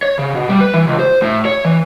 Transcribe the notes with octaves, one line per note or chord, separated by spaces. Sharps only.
C#5
C#3
B2
G3
B4
E3
C#2
C5
A2
C#5
E3